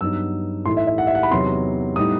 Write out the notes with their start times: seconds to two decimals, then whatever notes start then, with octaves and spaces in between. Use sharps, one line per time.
0.01 G2 F#3 B3 D#4 E6
0.65 A2 E3 A3 D#4 C6
0.77 E5
0.87 E5
0.98 F#5
1.07 E5
1.15 F#5
1.23 B5
1.31 E2 C3 F#3 B3 D#4 C6
1.96 A2 G3 B3 D#4 D#6